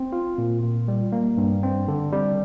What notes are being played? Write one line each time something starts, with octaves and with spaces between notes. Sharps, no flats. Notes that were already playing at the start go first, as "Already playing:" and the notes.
Already playing: C4
F4
A#2
A#2
G3
A#3
G2
C4
D3
G3